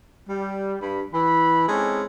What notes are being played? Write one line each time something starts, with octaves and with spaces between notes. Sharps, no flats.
G3
G2 B5
E3 B5
G#3 C4 C#4 D#4 E4 A4